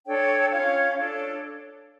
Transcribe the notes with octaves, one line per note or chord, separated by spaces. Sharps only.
D4 A4 C#5 G5
C#4 F4 C#5 F5
D4 A4 C#5